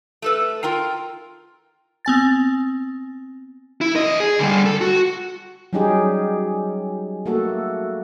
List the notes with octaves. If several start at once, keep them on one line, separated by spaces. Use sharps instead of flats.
A3 A4 B4
F4 A#4 G5 A#5
B3 C4 G#5 A6
E4
E2 D#5
G#4
D3 G3
A4
F#4
F#3 G3 C#4 D#4 G4 G#4
A3 A#3 F#4 A4